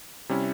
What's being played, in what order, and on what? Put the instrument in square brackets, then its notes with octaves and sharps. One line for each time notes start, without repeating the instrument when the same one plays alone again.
[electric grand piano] C3 G3 C#4 E4